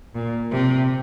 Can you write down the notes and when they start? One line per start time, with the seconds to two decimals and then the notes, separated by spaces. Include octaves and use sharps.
0.15 A#2
0.52 C3